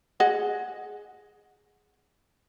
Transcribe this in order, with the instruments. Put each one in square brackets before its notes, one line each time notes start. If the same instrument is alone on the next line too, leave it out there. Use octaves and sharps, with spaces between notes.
[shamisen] G#4 D#5 F#5